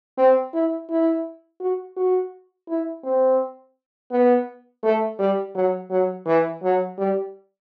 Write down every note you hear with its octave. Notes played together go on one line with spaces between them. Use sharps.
C4
E4
E4
F#4
F#4
E4
C4
B3
A3
G3
F#3
F#3
E3
F#3
G3